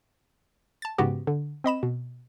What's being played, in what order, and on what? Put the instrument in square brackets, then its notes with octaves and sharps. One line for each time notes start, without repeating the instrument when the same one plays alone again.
[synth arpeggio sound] A5 A6
G#2 C#3 B3 F#4 G4
D3
C4 D#5 B5 E7
B2